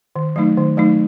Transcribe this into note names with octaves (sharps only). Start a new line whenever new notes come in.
D#3
F#3 A3 D#4
D#3
F#3 A3 D#4